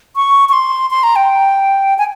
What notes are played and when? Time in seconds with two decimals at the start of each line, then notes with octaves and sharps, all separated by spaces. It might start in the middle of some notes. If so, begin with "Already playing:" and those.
0.16 C#6
0.49 C#6
0.53 C6
0.91 C6
1.03 A#5
1.16 G5
1.98 G#5